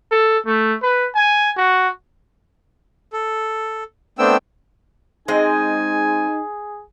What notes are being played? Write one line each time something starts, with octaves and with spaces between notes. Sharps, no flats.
A4
A3
B4
G#5
F#4
A4
A3 B3 C4 D4 G5 E6
G#3 C4 D#4 G#4 D#5 G#5